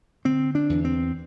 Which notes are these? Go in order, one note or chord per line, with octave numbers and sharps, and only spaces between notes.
D3 C4
D4
E2
C4